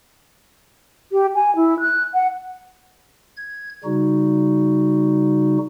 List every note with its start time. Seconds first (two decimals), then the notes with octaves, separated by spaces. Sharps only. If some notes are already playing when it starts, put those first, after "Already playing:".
1.12 G4
1.35 G#5
1.55 E4
1.80 F#6
2.13 F#5
3.37 G#6
3.84 C#3 G3 D#4 F#4